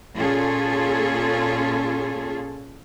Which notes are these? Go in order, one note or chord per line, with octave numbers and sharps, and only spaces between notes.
A#2 C#4 F4 G#4 A4